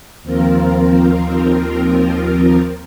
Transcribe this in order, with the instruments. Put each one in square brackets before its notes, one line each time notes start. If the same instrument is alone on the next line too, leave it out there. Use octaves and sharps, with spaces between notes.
[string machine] D#2 F3 C4 F4 A#4